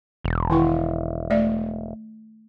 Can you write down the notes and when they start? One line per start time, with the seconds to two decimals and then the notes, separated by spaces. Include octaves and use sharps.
0.24 E1
0.50 D#3 E4 C#6
1.30 A3 D5 E5